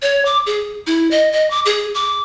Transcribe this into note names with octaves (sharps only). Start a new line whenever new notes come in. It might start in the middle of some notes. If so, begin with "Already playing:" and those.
C#5
D6
G#4
E4
D#5
D#5
D6
G#4
D6